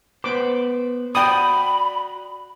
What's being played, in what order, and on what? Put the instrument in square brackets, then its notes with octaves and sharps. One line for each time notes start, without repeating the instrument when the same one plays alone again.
[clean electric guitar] B3 B4 C5 [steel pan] D6
[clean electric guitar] F#4 D5 [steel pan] G5 D#6 [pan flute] B5